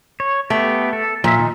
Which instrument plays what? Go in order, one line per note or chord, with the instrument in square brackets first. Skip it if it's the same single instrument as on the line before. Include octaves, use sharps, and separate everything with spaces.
[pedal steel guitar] C#5
[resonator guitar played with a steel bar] A3 [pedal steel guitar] B3 G4
[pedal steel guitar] A4
[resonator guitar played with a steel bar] A#2 [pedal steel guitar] F3 E5
[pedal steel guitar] D#3 D#4